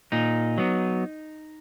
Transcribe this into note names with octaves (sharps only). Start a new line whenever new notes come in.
A#2 D#4
F#3 B3